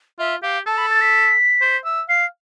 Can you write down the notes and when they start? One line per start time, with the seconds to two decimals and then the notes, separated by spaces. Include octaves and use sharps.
0.19 F4 E5
0.42 G4 F5
0.66 A4 A5
0.78 B5
0.90 A6
1.01 B6
1.61 C5
1.85 E5
2.09 F5 C7